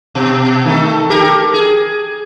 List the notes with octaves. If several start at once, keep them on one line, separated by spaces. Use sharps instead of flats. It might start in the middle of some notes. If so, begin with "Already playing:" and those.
B2
D#3 A3 A4
G4 A4 A#4
G#4